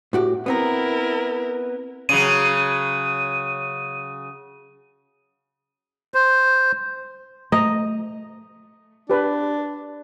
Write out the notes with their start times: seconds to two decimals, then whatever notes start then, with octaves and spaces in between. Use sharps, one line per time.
0.13 A2 F#4 G4
0.46 B3 C4 E4 A#4 A#5
2.09 C#3 F#3 D#7
6.14 C5
7.52 A3 D#5 A#5
9.10 D4 G4 B4